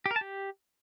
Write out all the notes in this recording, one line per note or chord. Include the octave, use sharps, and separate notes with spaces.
G4
A#4
A5
G4